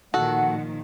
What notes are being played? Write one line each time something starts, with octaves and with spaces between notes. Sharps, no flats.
A#2 D#3 F3 F#4 A4 F#5